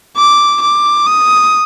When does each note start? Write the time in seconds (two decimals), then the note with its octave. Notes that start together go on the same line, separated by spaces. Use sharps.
0.17 D6
0.62 D6
1.07 D#6